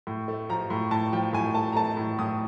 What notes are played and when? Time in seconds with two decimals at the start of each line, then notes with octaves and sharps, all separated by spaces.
0.07 A2
0.28 A3
0.49 F3 A#5
0.70 A2
0.91 A2 A5
1.12 F3 G5
1.33 A2 G#5
1.55 A3 A5
1.72 A#5
1.76 A3 A5
1.97 A2
2.19 A2 D#6